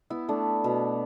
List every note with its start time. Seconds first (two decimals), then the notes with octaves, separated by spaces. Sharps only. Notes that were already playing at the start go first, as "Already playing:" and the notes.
0.10 B3 E4
0.29 A3 D4
0.64 B2